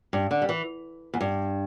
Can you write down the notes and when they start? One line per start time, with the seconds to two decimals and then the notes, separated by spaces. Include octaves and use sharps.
0.13 G2
0.31 D3
0.42 G3
0.49 E3
1.14 E2
1.21 G2